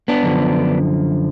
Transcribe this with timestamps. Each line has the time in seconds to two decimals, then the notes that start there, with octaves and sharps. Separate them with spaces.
0.08 B3 D4
0.23 F#2 D3 F3